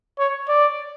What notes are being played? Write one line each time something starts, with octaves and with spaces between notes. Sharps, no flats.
C#5
D5